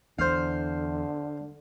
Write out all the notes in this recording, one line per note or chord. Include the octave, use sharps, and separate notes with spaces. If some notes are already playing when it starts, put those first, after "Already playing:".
E2 D3 C5 F5